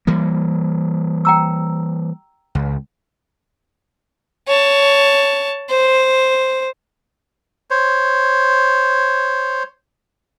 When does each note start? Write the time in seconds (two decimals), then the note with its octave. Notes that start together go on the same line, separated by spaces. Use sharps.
0.07 E3 G3 A#3
1.25 G5 A#5 E6
2.55 C#2
4.48 C#5 A5
5.70 C5
7.70 C5 C#5